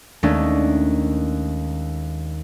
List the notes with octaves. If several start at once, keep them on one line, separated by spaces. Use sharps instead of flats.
D#2 G#3 A3 C#4 D4